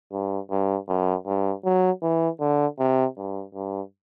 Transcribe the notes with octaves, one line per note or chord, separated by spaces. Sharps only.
G2
G2
F#2
G2
F#3
E3
D3
C3
G2
G2